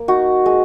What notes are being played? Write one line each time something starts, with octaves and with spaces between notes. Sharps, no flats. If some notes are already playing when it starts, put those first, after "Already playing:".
Already playing: A#3
D#4 F#4
G#3